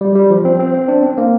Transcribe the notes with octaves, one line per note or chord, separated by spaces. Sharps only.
G3
G3
F3
C4
C4
C4
D4
C4
A#3